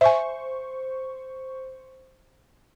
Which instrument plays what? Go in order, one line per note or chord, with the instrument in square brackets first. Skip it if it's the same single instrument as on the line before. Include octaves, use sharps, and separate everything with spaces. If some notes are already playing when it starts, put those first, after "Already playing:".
[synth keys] C5 C#6 [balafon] E5 G#5